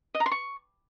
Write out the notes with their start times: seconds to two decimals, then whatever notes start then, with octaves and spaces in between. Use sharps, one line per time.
0.15 D#5
0.20 A#5
0.26 C6
0.31 C#6